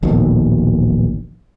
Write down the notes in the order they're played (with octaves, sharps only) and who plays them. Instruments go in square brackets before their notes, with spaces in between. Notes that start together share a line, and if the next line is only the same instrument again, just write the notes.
[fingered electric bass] D1 A#1 B2 D#3